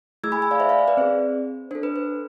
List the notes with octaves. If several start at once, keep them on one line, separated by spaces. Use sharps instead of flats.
A3 E4 G#4 E6 G#6
G#5 B5
G#5 B5
D5 F5
C5 E5
D5 F5
C5
B4 D5
C4 G#4 C5
D4 A4 C5
B4
C5